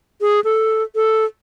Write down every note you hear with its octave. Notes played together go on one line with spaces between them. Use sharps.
G#4
A4
A4